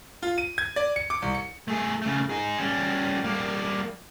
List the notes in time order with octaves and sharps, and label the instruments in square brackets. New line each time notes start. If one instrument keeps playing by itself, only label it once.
[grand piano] F4
D#7
G#6
D5
C#7
D6
C2
C#7
[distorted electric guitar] A3 G#4
C#3 A3
D#4 G#4
G3 C#4
G3 A#3